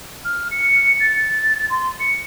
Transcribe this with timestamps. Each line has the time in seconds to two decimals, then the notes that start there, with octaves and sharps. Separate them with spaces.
0.25 F6
0.51 C#7
1.00 A6
1.70 C6
2.00 C#7